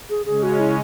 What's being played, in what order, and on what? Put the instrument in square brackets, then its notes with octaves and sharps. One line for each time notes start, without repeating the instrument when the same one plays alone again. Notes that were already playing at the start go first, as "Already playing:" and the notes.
[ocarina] G#4
[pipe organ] C#3 G#3 C#4 [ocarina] G#4
[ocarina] F#4
E4